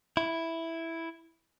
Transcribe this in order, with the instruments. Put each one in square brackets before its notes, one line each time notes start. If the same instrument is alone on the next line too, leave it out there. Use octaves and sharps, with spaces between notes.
[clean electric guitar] E4